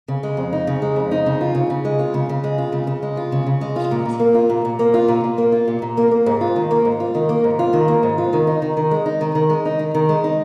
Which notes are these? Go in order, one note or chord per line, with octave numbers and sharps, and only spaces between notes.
C#3
G#3
F2
D#4
C#3
G#3
F2
D#4
C#3
F4
C#3
C#3
G#3
F4
C#3
C#3
G#3
F4
C#3
C#3
G#3
F4
C#3
C#3
G#3
F4
A#2
A#2
A#3
F4
A#2
A#2
A#3
F4
A#2
A#2
A#3
F4
A#2
A#2
A#3
A#3
G#2
F4
D#3
A#3
G#2
F4
D#3
A#3
G#2
F4
D#3
A#3
G#2
F4
D#3
D#4
D#3
D#3
G#3
D#4
D#3
D#3
G#3
D#4
D#3
D#3
G#3
D#4